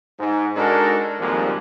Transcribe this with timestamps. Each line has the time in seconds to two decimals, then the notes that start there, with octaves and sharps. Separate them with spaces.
0.19 G#2
0.57 G#3 D4 D#4 F#4 A4 A#4
1.20 G#1 F2 F3 G3 G#3 A#3